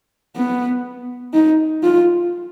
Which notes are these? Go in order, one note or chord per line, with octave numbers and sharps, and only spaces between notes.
B3
D#4
F4